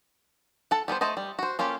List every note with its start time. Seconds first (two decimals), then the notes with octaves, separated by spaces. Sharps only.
0.71 A4 F#5
0.88 G3 B3 A#4 C5
1.01 A3 A4 C5 D#5
1.17 G3
1.39 F#4 C5
1.59 A#3 C#4 F4 G4 A4